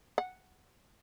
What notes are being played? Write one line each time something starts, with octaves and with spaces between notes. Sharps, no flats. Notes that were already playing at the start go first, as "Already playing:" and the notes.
F#5